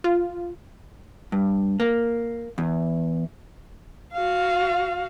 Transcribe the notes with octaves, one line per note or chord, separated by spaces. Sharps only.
F4
G2
A#3
E2
F#4 F5